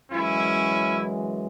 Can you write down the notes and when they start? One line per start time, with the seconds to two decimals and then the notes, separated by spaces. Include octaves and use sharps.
0.11 F#2 E3 G#3 C#4 E4